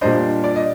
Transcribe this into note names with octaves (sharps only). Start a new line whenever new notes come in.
A#2 G3 D4 C5 D#5
D5
D#5